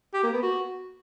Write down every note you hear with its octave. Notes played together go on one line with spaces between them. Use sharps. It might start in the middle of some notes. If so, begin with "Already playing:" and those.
G4
A#3
B3
F#4